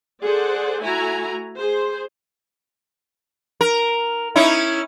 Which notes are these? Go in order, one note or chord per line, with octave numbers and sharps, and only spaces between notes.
G#4 A4 C5 D5 F#5
A3 E4 F#4 G#5 A#5
G#4 C5
A#4
C#4 D#4 E4